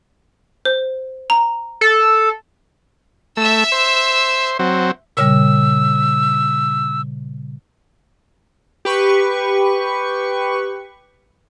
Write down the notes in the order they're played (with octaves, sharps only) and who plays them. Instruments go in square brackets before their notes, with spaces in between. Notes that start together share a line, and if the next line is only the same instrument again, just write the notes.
[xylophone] C5
A#5
[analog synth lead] A4
[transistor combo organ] A3 [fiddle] E5 E6
[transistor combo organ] C5
F#3 C4
[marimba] A#2 C#3 G3 [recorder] E6
[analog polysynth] G4 B4 C#6